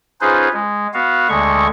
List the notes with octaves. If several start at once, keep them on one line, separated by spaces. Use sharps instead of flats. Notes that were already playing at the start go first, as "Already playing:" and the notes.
C#4 D#4 F4 G#4 B4 C5
G#3
B3 F#4 F5
D2 D3 G#3 C#6